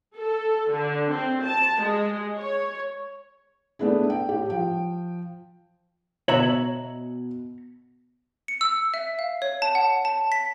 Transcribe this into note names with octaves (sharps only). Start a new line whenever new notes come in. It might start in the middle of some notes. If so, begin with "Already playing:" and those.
A4
D3
C4
A5
G#3
C#5
A3 B3 D4 E4 G#4
G5
A2 G4
F3 G5
B2 C#5 E5 A#5 F#7
C#7
E6
E5
F5
C#5
A5
F#5
A5
B6